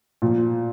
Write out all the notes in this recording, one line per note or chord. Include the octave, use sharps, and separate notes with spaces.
A#2 F3